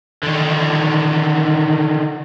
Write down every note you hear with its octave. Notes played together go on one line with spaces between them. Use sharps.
D3 D#3